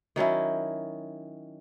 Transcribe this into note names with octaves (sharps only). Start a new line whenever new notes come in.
D#3 F#3 C#4 E4